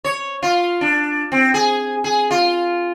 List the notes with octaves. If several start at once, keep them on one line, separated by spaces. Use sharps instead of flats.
C#5
F4
D4
C4
G#4
G#4
F4